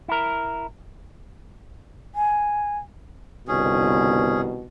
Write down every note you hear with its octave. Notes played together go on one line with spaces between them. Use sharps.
E4 A#4
G#5
G1 C2 B2 D#3 C#4 G#4